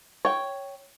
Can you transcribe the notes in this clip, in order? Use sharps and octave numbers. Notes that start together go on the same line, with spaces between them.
C#5 G5